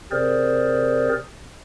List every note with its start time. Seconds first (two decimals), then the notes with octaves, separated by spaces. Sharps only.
0.11 C3 C4 G#4 A#4 C5 D5